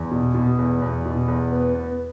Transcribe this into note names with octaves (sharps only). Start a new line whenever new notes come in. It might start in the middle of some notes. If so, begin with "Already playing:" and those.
Already playing: E2
B2
B2
E2
E2
B2
E2
B3
B3